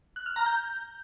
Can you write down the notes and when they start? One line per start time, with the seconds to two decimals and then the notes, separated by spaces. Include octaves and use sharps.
0.16 F#6
0.26 F6
0.36 A#5
0.46 G6